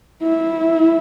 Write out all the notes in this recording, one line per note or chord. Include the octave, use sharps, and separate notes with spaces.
E4